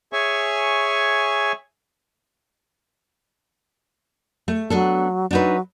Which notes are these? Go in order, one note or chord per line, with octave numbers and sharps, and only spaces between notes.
G#4 C#5 E5 G#5 C#6
A3
F#3 B3 D4 A4
F#3 D4 D#4 B4